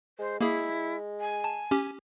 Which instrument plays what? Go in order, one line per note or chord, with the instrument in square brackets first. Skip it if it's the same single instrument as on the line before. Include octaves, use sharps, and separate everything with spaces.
[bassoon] G#3 [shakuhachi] C5
[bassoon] G#3 [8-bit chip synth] A#3 G#4 [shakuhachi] E4
[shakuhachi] G#5
[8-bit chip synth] A5
C#4 G4